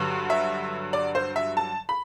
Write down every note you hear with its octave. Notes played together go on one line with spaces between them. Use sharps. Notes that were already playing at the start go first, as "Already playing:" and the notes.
Already playing: G2 D3 F#3
E5
D5
C5
E5
A5
B5